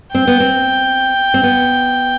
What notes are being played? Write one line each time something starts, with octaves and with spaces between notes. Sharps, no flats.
C4 G5
B3
C4
C4
B3